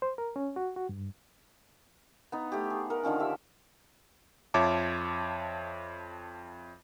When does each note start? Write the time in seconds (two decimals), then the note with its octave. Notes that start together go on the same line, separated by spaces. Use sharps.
0.02 C5
0.18 A#4
0.36 C#4
0.56 F#4
0.76 F#4
0.89 G2
2.32 B3 D#4
2.52 A3 G4
2.70 G#4
2.90 A#4 F#5
3.03 D3 D#3 F3 C#4
3.20 G4 E5
4.54 F2 F4 C#5 E5 A5 D6